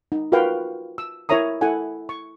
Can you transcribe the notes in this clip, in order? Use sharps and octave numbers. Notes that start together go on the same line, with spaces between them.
D#4
F4 F#4 A#4 B4 F5 G5
E6
E4 A#4 C#5 E5 A#5 D#6
E4 A4 F#5 G#5
C#6